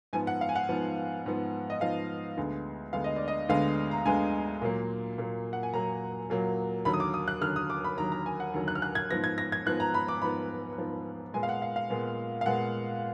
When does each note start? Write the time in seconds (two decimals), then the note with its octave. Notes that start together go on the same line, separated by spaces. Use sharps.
0.13 G#2 F3 B3 G#5
0.27 F#5
0.41 F5
0.49 G#5
0.56 F#5
0.69 G#2 F3 B3
1.26 G#2 F3 B3
1.70 D#5
1.81 G#2 F3 B3 F5
2.37 D2 D3 G#3 B3
2.93 D2 D3 G#3 B3 F5
3.04 D#5
3.16 D5
3.28 D#5
3.49 D2 D3 G#3 B3 F5
3.91 A#5
4.05 D2 D3 G#3 B3 G#5
4.62 A#2 F#3 A#3
5.18 A#2 F#3 A#3
5.53 F#5
5.63 G#5
5.74 A#2 F#3 A#3 A#5
6.30 A#2 F#3 A#3
6.85 D#2 D3 F#3 B5
6.93 D#6
7.00 D6
7.14 D#6
7.28 F#6
7.41 D#2 D3 F#3 F6
7.56 D#6
7.70 D6
7.84 B5
7.98 D#2 D3 F#3 A#5
8.12 A#5
8.26 G#5
8.40 F#5
8.54 D#2 D3 F#3
8.68 F#6
8.75 F6
8.82 F#6
8.95 G#6
9.10 G#2 F3 B3 A#6
9.24 G#6
9.38 A#6
9.52 G#6
9.65 G#2 F3 B3 F#6
9.80 A#5
9.94 B5
10.08 D6
10.21 G#2 F3 B3 B5
10.78 G#2 F3 B3
11.34 A#2 G#3 B3 G#5
11.43 F5
11.49 F#5
11.62 F5
11.76 F5
11.90 A#2 G#3 B3
12.41 F5
12.46 A#2 G#3 B3 F#5